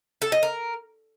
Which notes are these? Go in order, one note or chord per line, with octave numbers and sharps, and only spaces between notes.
A4
D#5
A#4